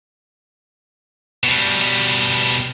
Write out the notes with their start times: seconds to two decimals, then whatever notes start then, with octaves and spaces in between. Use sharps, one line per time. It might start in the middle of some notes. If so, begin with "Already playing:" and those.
1.43 B2 G3